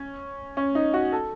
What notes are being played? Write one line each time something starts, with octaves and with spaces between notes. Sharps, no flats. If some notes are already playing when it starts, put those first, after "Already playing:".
Already playing: C#4
C#4
D#4
F#4
A4